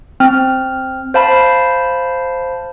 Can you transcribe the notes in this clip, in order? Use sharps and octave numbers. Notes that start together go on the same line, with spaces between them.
C4 F6
C5 F5 A5 B5